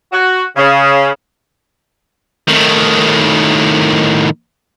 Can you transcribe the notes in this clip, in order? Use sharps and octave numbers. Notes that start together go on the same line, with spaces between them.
F#4
C#3
A2 D#3